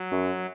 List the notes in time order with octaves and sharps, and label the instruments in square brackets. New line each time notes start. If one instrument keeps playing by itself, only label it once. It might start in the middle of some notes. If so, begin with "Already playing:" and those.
Already playing: [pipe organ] F#3
[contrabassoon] F#2